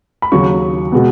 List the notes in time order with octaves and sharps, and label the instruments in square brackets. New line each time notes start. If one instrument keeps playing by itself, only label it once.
[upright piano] B5
D#2 C#3 F#3 C#6
B2 G#3 B3